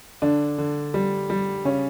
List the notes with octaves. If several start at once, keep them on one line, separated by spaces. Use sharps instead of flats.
D3 D4
D3
G3
G3
C#3 C#4